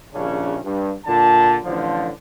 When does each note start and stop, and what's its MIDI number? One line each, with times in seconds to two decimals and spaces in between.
0.14 0.58 34
0.14 0.58 39
0.14 0.58 49
0.14 0.58 61
0.14 0.58 62
0.65 0.92 43
1.06 1.56 46
1.06 1.56 50
1.06 1.56 81
1.64 2.08 33
1.64 2.08 50
1.64 2.08 53